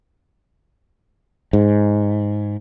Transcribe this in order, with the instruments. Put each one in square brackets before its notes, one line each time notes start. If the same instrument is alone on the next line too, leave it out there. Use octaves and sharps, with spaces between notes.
[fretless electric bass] G#2